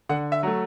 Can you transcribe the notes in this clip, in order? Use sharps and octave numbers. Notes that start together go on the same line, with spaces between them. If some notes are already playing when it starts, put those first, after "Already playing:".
D3 F#5
E5
F#3 A3